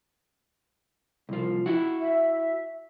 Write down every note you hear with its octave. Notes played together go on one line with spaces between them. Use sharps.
C2 F3
E4 F#4
E5